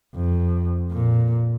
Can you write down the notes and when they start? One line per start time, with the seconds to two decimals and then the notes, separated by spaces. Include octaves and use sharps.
0.15 F2
0.92 A#2